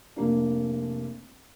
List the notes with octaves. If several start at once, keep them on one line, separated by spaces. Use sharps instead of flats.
F1 A#3 D4